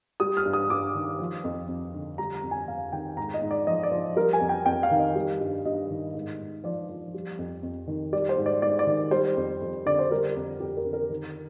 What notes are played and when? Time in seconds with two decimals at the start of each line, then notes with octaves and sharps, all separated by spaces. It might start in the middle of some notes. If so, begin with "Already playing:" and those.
0.20 G3 D#6
0.37 F6
0.45 G2
0.53 D#6
0.70 G2 D6
0.95 D#3
1.19 F3
1.44 F2
1.68 F2
1.94 D3
2.18 G3 A#5
2.35 A#5
2.43 F2
2.51 G#5
2.68 F2 F5
2.92 D#3 G5
3.17 G#2 A#5
3.34 D#5
3.42 G#2
3.51 D5
3.67 F3 D#5
3.83 D5
3.91 F3
4.16 G3 A#4
4.33 G#5
4.41 F2
4.49 G5
4.66 F2 G5
4.83 F5
4.91 D#3
4.99 D#5
5.15 G3
5.40 G2
5.66 G2 D#5
5.90 D#3
6.14 G#2
6.39 G#2
6.64 F3 D5
6.89 F3
7.14 G3
7.39 F2
7.63 F2
7.87 D#3
8.13 G3 D5
8.29 C5
8.37 G#2
8.46 D5
8.62 G#2 D5
8.79 D5
8.87 D#3
9.11 G3 C5
9.37 F2
9.61 F2
9.86 D3 D5
9.99 C5
10.11 G3 A#4
10.36 F2
10.60 F2 G4
10.77 A#4
10.85 D3
10.93 A#4
11.10 D#3